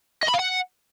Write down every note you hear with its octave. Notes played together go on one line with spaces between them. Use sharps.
D#5
B5
F5
F#5